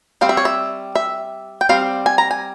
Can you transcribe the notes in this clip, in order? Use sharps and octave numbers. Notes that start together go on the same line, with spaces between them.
G3 C4 F5
E5
C#5
E5
E5
G5
G3 C4 F5
G#5
A#5
G#5